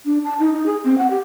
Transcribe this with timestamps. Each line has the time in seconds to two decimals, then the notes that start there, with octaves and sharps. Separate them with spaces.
0.05 D4
0.24 A5
0.40 D#4
0.53 D#4
0.66 G#4
0.84 C4
0.98 F#5
1.11 G4